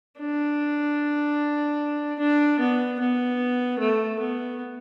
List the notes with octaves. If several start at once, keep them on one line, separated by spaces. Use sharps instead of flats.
D4
D4
B3
B3
A3
B3